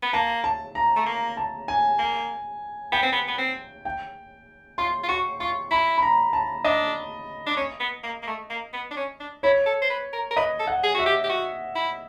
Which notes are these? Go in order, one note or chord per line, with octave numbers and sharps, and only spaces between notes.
B3
A#3 A5
A5
A#5
A3
A#3
A5
G#5
A#3
B3 G5
C4
B3
B3
C4
G5
F4 C6
F4
F#4 C#6
F4 C#6
E4 B5
B5
A#5
A5
D4 D#5
D4
C#4
B3
A#3
A#3
A3
A#3
B3
D4
C#4
D4
E4 C#5
A4
C5
B4
A#4
A#4
B4 D#5
A4
F#5
G#4
F#4 E5
G4
G4
F#4
E4